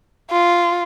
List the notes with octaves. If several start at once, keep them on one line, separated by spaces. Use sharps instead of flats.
F4